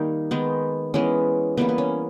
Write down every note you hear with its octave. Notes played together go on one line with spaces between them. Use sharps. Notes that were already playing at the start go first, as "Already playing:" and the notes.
Already playing: D#3 G3 A#3 D#4
D#3 G#3 B3
E3 G#3 B3 C#4
E3 G3 A#3 B3
B3
C#4